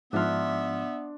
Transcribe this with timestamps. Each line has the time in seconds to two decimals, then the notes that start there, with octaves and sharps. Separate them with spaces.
0.13 G#2 F3 B3 D4 E5 C6 F6